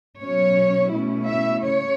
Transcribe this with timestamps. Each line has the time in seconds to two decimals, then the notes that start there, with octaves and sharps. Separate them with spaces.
0.20 B2 F#3 C#4 C#5
0.93 B2 A3 C#4 E4
1.29 E5
1.65 C#3 C#5